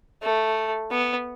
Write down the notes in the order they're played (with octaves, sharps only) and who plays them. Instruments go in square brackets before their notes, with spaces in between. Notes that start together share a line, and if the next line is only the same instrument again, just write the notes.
[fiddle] A3
B3